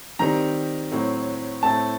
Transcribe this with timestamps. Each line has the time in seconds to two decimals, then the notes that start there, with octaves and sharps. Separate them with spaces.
0.19 D#3 G3 C4 A#5
0.92 A2 F#3 C4
1.63 A2 A3 C4 A5